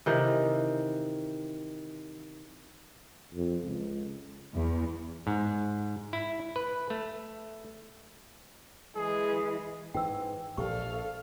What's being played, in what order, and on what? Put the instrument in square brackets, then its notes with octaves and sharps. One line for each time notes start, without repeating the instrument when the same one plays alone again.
[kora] C3 D#3 E3
[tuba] F2
C#2
[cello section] E2
[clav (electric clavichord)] G#2
E4
B4
A3
[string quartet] E3 G#3 [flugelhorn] G#4
[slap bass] G#2 E3 [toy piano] G5 E6
[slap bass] A#1 [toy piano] G4 C#6 [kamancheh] A4 F5